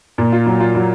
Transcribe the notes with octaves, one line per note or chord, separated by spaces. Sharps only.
A#2
F4
F#3
F4
F#3